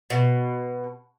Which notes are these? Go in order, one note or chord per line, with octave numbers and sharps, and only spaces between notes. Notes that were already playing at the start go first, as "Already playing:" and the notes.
B2